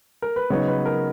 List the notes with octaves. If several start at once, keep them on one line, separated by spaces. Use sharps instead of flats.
A#4
B4
C#3 F#3 B3 D#4 C#5
B4
A#4